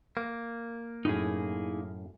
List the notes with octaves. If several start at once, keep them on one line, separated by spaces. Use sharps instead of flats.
A#3
F#2 A2 D#4 E4 G#4